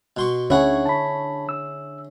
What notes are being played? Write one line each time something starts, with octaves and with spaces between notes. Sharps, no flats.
B2 C6 C#6
D2 D3 C#4 E4 G#4 C#5 F#5
A5 B5
E6